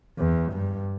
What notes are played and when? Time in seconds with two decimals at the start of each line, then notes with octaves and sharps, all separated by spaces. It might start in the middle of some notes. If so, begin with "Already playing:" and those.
0.18 E2
0.53 G2